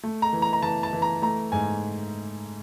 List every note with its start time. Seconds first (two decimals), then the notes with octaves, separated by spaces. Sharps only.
0.03 A3
0.22 A#5
0.33 E3
0.42 A#5
0.53 A#5
0.62 E3 A5
0.83 A5
0.93 E3
1.02 A#5
1.22 A3 A#5
1.52 G#2 G#5